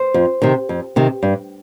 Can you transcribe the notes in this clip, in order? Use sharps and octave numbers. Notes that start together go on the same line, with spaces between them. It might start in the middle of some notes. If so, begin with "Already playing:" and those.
Already playing: C5
F2
C3 D#3
F2
C3 D#3
G2